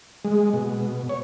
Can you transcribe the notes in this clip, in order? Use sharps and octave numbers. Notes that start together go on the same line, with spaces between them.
G#3
B2
C#5